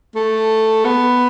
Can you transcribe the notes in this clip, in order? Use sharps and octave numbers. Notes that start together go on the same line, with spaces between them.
A3
B3